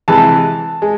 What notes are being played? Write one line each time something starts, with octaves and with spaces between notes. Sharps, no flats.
C3 E3 G#3 A5
G#3